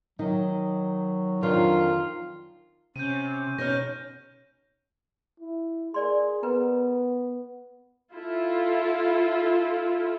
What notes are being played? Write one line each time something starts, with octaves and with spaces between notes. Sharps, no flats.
D#3 F#3 D#4
F2 D#3 D4 F4
C3 C#4 G6 D#7
B2 C#4 D#4 C#5 F6 G6 A#6
E4
G#4 A#4 D5 C6
B3 E4 A#4 B4
E4 F4 A4